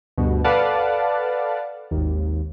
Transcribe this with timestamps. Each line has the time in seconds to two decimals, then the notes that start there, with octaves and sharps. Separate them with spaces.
0.18 D2 G2 B2
0.44 A4 B4 D5 F5 F#5 A5
1.91 G#1 D#2